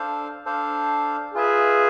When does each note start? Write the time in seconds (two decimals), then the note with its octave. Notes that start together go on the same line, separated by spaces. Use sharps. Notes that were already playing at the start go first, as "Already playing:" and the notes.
Already playing: D4 A4 C5 F5
0.46 D4 A4 C5 F5
1.34 F4 G#4 B4 E5